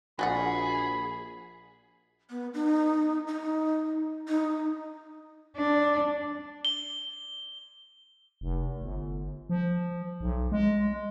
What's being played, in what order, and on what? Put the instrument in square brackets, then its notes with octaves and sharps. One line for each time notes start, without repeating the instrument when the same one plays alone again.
[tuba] A#1 [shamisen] F#4 D5 F#5 [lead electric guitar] G#4 [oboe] B5
[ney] B3
D#4
D#4
D#4
[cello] D4
[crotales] G7
[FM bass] F1
G1
F3
B1
G#3